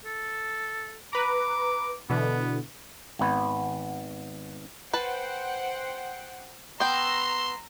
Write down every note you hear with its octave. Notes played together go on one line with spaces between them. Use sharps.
A4
B4 A#5 D6
B2 D3 E3 B3
G#1 B3
B4 C5 F#5 G5 A5
B3 G5 A#5 C6 E6